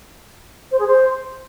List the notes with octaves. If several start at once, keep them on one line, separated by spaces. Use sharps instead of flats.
C5
G#4
C5